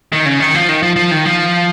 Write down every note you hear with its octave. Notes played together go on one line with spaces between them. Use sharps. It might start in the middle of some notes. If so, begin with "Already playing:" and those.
D#3
C#3
D#3
F3
D#3
F3
F3
D#3
F3